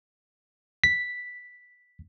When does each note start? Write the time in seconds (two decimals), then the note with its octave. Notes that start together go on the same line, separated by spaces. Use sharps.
0.84 B6